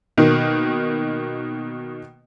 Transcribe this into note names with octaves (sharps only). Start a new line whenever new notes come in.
B2 D#3 A#3